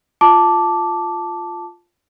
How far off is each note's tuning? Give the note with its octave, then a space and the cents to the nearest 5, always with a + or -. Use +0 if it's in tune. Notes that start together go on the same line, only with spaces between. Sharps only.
F4 +0 A5 +0 D6 -5